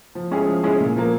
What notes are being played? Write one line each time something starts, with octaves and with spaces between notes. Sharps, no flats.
F3
G#3 C#4 E4 G#4
F3
G#3 C#4 E4 G#4
A#2
F3 A#3